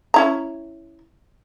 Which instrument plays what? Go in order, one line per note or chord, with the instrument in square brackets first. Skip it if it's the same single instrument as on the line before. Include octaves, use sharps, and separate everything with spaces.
[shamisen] C#4 E4 A#5